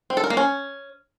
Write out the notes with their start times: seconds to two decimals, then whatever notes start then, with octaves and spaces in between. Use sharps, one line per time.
0.10 C4
0.17 A4
0.24 A#4
0.30 A#3
0.37 C#4